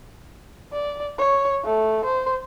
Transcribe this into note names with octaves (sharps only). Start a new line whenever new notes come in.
D5
C#5
A3
C5